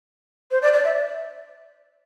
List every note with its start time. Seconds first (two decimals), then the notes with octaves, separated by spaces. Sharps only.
0.51 C5
0.62 D5
0.73 D5
0.84 E5